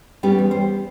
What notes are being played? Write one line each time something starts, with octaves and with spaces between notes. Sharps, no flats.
G3 B3 C#4 G4
E2
C5